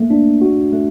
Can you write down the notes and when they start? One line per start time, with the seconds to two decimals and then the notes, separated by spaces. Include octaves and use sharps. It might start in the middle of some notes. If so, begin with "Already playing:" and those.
Already playing: A3 A#3
0.10 D4
0.41 F#4
0.73 A3